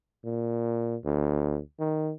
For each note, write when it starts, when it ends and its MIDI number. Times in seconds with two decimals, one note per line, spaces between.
0.24 0.96 46
1.05 1.59 38
1.79 2.12 51